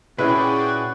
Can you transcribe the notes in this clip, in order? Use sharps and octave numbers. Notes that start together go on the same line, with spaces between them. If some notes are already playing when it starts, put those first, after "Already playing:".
A#2 C#4 E4 F#4 G#4 B4 D5 G5